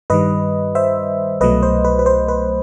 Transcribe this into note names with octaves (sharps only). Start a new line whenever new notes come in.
G2 D#3 G3 B4 D#5
C5 E5
C2 B2 F#3 A3 B4 D#5
C5
B4
B4
C5
B4